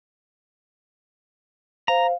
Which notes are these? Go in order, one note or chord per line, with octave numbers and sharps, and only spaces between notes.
C5 F5 A#5